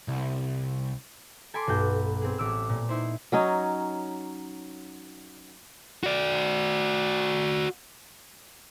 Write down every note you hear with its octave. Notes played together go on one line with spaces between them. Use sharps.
C2
A4 G#5 B5 C6 D6
B1 G2 F#4 G6
C4 G#4
A1 D6 E6
A#2
D#4 E4 C5
F#3 C#4 D#4
F#4 D5